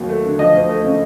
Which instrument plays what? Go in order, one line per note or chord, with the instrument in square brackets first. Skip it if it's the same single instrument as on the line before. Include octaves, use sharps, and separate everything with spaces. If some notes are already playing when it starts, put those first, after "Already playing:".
Already playing: [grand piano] D#2 F#3
A3
D3
[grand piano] F3 [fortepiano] D#5
[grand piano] D2
A3
C#3